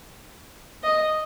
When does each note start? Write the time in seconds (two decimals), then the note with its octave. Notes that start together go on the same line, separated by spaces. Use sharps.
0.84 D#5